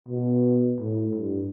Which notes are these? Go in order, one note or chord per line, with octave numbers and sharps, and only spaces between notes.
B2
A2
G2